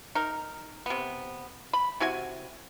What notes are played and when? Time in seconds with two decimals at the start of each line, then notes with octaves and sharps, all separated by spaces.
0.15 D#4 A#4
0.86 C3 B3
1.73 B5
2.00 C3 E4 F#4 G#5